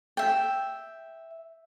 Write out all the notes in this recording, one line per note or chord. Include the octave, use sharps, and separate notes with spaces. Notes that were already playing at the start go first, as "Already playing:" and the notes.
E5 G5